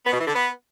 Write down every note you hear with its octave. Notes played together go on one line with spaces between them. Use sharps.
B3
B2
E3
D3
B3